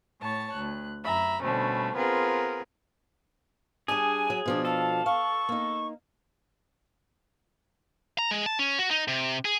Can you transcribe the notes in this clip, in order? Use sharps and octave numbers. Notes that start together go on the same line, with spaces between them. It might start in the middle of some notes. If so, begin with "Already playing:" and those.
A2 C#5 A5 A6
D2 F#6
F#2 E5 A#5 B5
B2 D3 G3 A3 C4 C#4
B3 C4 F4 G#4 A#4 B4
G3 D4 G#4 G#5
F#3
B2 F3 D4
A4 F5
F5 C#6
A#3 D#4
A#5
G#3
A5
C#4
F#4
D#4
C3
G#4